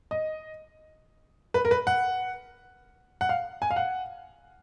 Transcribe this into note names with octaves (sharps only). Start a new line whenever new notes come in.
D#5
B4
A#4
B4
F#5
F#5
F5
G#5
F5
F#5